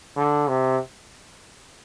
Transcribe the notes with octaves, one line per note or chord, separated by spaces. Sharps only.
D3
C3